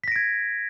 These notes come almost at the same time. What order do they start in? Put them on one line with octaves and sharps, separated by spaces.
B6 A#6 D7 G#6